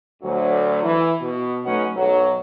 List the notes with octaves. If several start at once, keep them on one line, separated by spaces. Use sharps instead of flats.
D2 F#3
E3
B2
F#3 A3 C#4 D#4 B4 F#5
B1 G#2 F#3